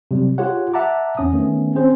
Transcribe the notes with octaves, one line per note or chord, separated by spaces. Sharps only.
C3 F#3 G3
F4 G4 G#4 C#5 F#5
E5 F#5 A5 A#5 D6
E2 C#4 D#6
D#3 A3 B3 C#4
C4 C#4 G#4 C5